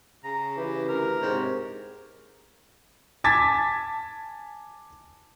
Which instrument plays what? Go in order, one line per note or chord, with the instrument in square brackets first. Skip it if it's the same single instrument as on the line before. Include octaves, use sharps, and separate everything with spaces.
[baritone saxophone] C#3 [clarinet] A#5
[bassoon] E3 [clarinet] G4
[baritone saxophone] D2 [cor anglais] A#4
[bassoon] G#2 [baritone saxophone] C3 [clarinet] C#5
[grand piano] G#5 A5 D6 G#6 A6 B6